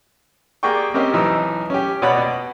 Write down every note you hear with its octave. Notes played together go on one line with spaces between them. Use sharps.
A#3 G4 G#4 D5 G5 C#6
C4 C#4 G4 A#4 D#5
B1 E3 D#4 E6
C#4 G4
B2 F#4 C#5 D5 F#5 B5
B2